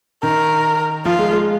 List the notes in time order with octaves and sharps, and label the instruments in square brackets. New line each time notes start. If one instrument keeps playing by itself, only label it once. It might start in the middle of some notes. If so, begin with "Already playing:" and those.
[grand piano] D#3 [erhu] A#4
[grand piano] F3 [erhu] F4
[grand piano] G#3
G#3